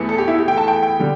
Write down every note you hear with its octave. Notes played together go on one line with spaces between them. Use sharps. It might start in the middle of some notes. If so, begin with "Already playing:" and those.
Already playing: E2 E3 A3
A4
G4
E4
G4
G5
A5
G5
G5
D3 G3